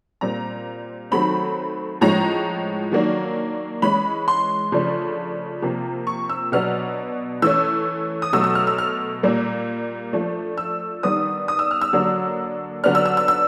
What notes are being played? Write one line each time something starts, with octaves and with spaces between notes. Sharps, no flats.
A#2 G3 C4 A#5
D#3 F#3 A3 C4 B5
A2 F3 G#3 C#4 A#5
D#3 F#3 A#3 D4
E3 G#3 C#4 B5
C6
C#3 F3 A3 D4
C3 F3 A#3
C#6
E6
B2 F#3 B3 D4 F6
E3 A3 C#4 E6
D#6
B2 F#3 A3 E6
E6
F6
E6
F6
A#2 G3 A#3
F3 A3 D4
E6
D#3 G3 B3 D4 D#6
D#6
E6
F6
E6
D3 F#3 A#3 D4
D3 F#3 B3 D4 F6
E6
E6
E6
E6